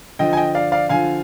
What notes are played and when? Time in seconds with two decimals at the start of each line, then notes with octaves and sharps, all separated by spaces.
0.19 D3 F3 D#5 G5
0.33 G#5
0.37 D#5 G5
0.55 D5 F5
0.72 D5 F5
0.89 D3 F3 F5 G#5